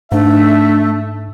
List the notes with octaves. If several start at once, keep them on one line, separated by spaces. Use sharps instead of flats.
G#2 A3 D4 E5